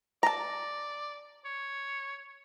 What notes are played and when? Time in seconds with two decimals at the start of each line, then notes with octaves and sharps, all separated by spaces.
0.23 D5 A5 A#5
1.45 C#5